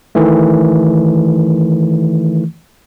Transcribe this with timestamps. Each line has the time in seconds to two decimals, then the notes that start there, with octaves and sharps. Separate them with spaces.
0.15 D#3 E3 A3